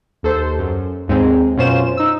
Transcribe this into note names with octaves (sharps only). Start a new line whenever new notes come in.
D#2 A4 C5
F#2
D#2 G#2 G#3 C4
F#2 B2 C#4 F4 C5 E7
D#4 E6